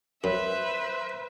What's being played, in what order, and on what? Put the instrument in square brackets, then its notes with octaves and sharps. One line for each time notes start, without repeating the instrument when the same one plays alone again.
[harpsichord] F#2 [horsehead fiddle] B4 [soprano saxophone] C5 [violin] E5